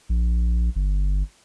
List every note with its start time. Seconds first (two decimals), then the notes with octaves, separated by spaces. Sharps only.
0.09 A#1
0.76 G1